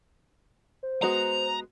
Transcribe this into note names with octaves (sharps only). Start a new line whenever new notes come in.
C5
G#3 B3 F#4 A#5